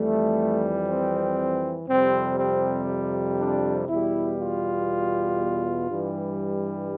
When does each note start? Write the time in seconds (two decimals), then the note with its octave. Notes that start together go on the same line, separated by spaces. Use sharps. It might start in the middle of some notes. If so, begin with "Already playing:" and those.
Already playing: F2 E3 G3 A3
0.88 C4
1.88 F2 C3 G3 C4
2.38 C4
3.39 D4
3.88 E2 B2 G3 E4
4.38 F4
5.89 G2 E3 G3